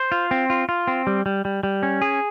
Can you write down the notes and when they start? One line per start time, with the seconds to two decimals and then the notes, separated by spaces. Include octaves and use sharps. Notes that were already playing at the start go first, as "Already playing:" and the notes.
Already playing: C5
0.12 F4
0.31 C4
0.50 F4
0.69 F4
0.87 C4
1.07 G3
1.26 G3
1.45 G3
1.63 G3
1.83 C#4
2.02 G#4